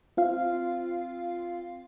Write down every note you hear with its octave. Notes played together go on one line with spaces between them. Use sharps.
C4 F4 F5